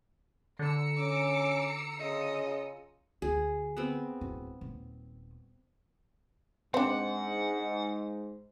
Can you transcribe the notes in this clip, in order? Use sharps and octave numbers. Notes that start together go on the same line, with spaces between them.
D3 A#5 E6 C#7
C#4 D6
C#3 F4 D#5
D2 G#4
B3 C4
D1 A2
D#1
G#2 C4 D4 F#5